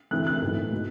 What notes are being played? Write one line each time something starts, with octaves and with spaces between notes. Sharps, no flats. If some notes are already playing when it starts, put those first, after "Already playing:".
D2 C3 E3 F#6
F#6
B1 A2 E3
B2